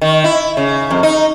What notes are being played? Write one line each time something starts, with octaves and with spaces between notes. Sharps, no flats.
D#3
E4
C#3
F2
D#4